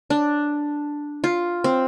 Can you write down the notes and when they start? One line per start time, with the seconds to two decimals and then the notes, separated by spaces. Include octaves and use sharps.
0.10 D4
1.24 F4
1.64 C4